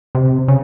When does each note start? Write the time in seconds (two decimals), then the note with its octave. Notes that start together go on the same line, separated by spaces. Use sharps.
0.15 C3
0.48 C#3